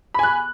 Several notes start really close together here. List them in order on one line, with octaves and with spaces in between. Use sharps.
B5 G#5 F#6